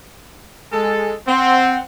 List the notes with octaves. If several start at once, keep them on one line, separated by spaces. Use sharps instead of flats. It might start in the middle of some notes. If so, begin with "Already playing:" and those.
G#3 A4
C4 F#5